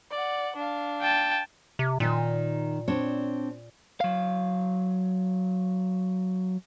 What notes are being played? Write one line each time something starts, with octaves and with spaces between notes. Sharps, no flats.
D5 F#5
D4 F5
G5 A5
C3
A#2 D#3 D#4
C4 D4 C#5
F#3 F5